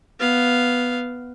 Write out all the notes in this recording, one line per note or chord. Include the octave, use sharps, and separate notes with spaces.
B3 F5